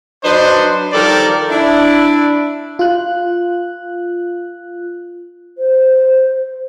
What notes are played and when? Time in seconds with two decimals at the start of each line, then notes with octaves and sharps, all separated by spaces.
0.23 F#3 D4 D#4 B4 C5
0.93 D#3 F3 G3 A4 A#4 D5
1.49 D4 E4
2.79 F4 F#6
5.58 C5